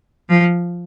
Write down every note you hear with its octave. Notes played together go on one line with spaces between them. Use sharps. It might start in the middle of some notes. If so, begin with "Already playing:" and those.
F3